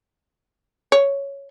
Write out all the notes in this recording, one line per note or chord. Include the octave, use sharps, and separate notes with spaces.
C#5